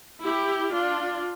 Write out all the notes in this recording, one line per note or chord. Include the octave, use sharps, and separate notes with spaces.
E4 G4
D4 F4